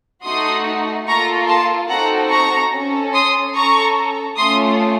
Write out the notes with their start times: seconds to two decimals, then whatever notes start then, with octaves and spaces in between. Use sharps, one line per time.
0.23 A3 D#4 F#4 C6 D#6
1.07 A#3 F4 A4 A#5 C#6
1.47 A5 C6
1.89 C4 D#4 F#4 A4 F#5 A#5
2.30 A#5 C#6
2.72 C#4 A4
3.13 C6 D#6
3.54 C#4 A4 A#5 C#6
4.37 A3 C#4 F4 C6 D#6